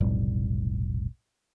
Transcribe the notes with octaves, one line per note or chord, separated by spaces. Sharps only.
F1 B1 A2 G3